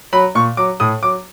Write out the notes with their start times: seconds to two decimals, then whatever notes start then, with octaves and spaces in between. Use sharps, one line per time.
0.13 F#3 B5
0.35 A#2 C#6
0.57 F#3 D6
0.80 A2 D#6
1.03 F#3 D6